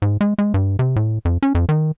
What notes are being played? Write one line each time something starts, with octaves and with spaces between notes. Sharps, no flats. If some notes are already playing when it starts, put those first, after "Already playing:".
G#2
G#3
G#3
G2
C3
A2
F2
C#4
F2
D#3